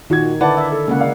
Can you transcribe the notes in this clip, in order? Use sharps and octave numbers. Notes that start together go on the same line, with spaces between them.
A#2 D#3 F#4 G#6
D3 E4 B4 D5 F#5 A5
E5
A4
C#3 G#3 A#3 F#5
D5 F5